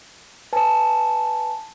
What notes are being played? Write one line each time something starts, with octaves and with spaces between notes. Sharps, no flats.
B4 G#5 A5